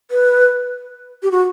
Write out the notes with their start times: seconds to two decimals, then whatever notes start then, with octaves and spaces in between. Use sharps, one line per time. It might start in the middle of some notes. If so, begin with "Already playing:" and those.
0.11 B4
1.23 G4
1.31 F#4